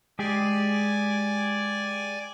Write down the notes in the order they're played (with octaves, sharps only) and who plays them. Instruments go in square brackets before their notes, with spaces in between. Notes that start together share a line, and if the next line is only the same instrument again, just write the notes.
[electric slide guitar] G#3 G4 G#4 [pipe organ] D5 G#5